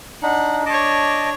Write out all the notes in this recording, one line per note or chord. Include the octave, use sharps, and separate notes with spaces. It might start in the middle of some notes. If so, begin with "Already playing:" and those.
D4 D#4 F#5
D4 C#5 D#5 A5 D6